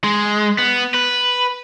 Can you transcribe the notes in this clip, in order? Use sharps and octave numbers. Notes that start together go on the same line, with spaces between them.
G#3
B3
B4